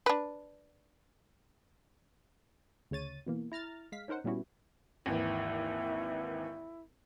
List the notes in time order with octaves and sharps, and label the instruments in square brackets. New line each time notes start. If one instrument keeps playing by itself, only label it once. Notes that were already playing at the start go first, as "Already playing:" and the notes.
[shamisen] D4 B4
[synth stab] D2 C#3 C#5 A6 D#7
B2 E3 A#3
E4 A#5 F6 A6
G#3 F5 B6
C#4 D#4 A#4 C5 F#5
A#2 G3 B3 C#4 E4 F#4
[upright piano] G#1 D#2 E3 [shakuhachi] E4